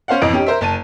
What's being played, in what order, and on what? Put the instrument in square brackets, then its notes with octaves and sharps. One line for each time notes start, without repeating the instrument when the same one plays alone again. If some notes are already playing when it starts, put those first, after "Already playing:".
[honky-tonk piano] C#4 C5 F5 F#5
G#1 F2 E3 D#5 D7
C#4 D#4 G4
A#4 C5 E5
F#1 A5 D#7